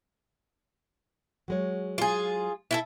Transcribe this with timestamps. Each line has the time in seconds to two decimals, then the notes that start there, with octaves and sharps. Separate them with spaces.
1.48 F#3 G#3 C#5
1.98 F4 G#4
2.71 E4 F4 A4